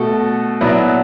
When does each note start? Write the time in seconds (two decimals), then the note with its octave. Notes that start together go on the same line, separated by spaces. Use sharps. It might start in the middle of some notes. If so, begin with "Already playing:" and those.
Already playing: B2 A3 F#4 A4
0.61 B2 F#3 B3 E4 D5